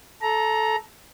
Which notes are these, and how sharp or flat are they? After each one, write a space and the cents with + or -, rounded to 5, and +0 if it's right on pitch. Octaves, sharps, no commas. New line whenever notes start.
A4 -15 A#5 +10